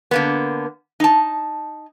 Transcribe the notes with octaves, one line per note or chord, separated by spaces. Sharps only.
D3 A#3 B3
D#4 A5